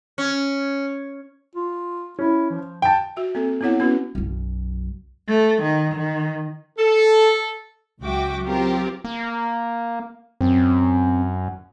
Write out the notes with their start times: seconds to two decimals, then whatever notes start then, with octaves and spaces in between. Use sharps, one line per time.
0.18 C#4
1.55 F4
2.19 C#4 E4
2.50 F3
2.82 G5 A5
3.17 F#4 E5
3.35 A#3 C4 A4
3.61 B3 C4 E4 C#5 F#5
3.80 B3 C#4 E4 F#4 B4
4.15 B1 F#2
5.29 A3
5.63 D#3
5.95 D#3
6.79 A4
8.00 C#2 F#3 F#4 E5 G5 D6
8.45 F#3 C4 F4 G4 A#4
9.04 A#3
10.41 F#2 C4